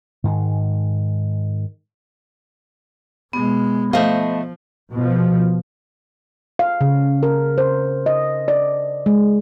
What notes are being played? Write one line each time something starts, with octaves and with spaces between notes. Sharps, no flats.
G#2 D#3 G#3
B2 G#3 B3
F3 A3 C5 D#5 F5
B2 F3
F5
C#3
A#4
C5
D#5
D5
G#3